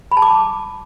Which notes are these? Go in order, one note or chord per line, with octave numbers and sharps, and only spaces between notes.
B5
A5
D6